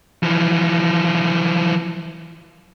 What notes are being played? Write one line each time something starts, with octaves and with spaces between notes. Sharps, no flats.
E3 F3